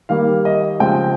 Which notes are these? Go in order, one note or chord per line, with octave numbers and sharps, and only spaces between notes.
D#3 G3 A#3 F5
D#5
C#3 F3 G#3 C4 G5